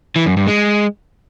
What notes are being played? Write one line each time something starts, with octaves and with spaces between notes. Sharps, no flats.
E3
F#2
G2
G#3